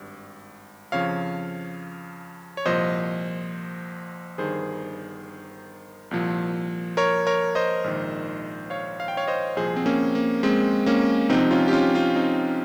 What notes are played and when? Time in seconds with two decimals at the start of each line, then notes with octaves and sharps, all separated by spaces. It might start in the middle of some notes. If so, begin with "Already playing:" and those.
Already playing: G#1 G2
0.92 F2 C#3 F3 C#5 F5
2.57 C#5
2.65 C2 A#2 F3 C5 D#5
4.38 G1 G2 D#3 G#4 C5
6.11 C2 A#2 F3
6.97 A#4 C#5
7.27 A#4 C#5
7.55 C5 D#5
7.84 A#1 G#2 D#3
8.70 C#5 F5
9.00 F5
9.08 G5
9.17 C#5 F5
9.27 C5 D#5
9.56 C2 A#2 F3 G#4 C5
9.76 C4
9.86 A#3 C#4
10.15 A#3
10.43 G#3 C4
10.86 A#3 C#4
11.29 C2 C3 F3 C4 D#4
11.51 C#4 F4
11.68 G4
11.73 C#4 F4
11.95 C#4 F4
12.16 C4 D#4